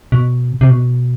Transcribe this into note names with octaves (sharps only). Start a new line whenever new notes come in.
B2
C3
B2